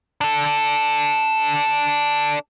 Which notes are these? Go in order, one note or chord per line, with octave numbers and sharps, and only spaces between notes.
D4 A4